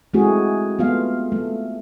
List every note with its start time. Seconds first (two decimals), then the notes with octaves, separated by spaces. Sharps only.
0.14 G#3 A3 C4 E4 F#4 G#4
0.79 A3 B3 F4 F5
1.32 A3